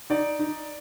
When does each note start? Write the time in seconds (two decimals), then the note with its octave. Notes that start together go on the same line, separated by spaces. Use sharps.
0.10 D#4 D5
0.39 D#4